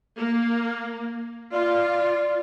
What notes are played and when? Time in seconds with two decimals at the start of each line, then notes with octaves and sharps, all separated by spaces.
0.18 A#3
1.52 F4 D5